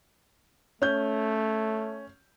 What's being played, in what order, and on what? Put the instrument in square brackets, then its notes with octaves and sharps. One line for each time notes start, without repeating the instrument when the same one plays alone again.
[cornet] A3 [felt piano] C#4 G6